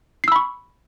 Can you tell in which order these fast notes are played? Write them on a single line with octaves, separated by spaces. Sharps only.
C7 E6 B5 C#6